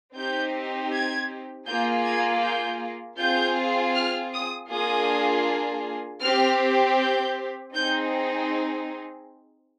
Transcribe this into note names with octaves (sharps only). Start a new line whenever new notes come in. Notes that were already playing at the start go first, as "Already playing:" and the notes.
C4 D#4 G4 G6
G#6
A#3 F4 G#4 G6
G#6
G6
C4 F4 G#4 G6
F6
D#6
A#3 D4 F4 G#4 D#6
C4 G4 F6
G6
C4 D#4 G#4 G6